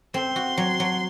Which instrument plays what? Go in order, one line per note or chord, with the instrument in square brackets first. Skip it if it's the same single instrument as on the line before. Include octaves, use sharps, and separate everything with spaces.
[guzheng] C4 [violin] C6
[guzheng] F#4
F#3
F#3